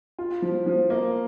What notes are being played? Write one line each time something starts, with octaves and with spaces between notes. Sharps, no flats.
F4
F3
F3
A#3